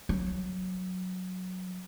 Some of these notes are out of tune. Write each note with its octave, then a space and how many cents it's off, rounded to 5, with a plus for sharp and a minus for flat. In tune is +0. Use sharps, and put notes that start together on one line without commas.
F#3 -5